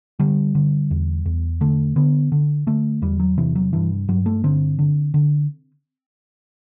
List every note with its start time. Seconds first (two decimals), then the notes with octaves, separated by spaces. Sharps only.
0.19 D3 G3
0.55 D3
0.91 E2
1.26 E2
1.61 D3 A3
1.96 D3 B3
2.32 D3
2.67 D3 A3
3.02 E2 G3
3.20 F#3
3.38 C3 E3
3.55 F#3
3.73 G2 E3
4.08 G2 F#3
4.26 A3
4.44 D3 C4
4.79 D3
5.14 D3